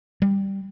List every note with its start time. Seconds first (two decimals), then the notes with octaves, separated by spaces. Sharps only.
0.22 G3